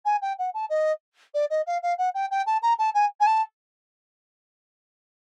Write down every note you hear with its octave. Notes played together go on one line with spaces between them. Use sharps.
G#5
G5
F#5
A5
D#5
D5
D#5
F5
F5
F#5
G5
G5
A5
A#5
A5
G#5
G#5
A5